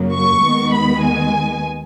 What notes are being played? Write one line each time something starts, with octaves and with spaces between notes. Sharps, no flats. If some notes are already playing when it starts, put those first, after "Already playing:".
Already playing: F#2 C#3 F#3 A#3
C#6
D#2 D#3 G#3 B3
B5
G#5